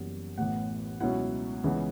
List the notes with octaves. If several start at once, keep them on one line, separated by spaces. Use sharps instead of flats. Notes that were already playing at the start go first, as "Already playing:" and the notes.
Already playing: F#1 F#2 E3 G3 B3
A1 A2 E3 B3 F#5
C#2 B2 F#3 C#4 E4 F#5
C#2 C#3 E3 B3